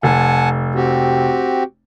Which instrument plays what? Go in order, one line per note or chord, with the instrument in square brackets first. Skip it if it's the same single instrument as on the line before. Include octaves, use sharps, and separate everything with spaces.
[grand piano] F1 [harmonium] F#5 G#5 A5
[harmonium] C4 F#4 G4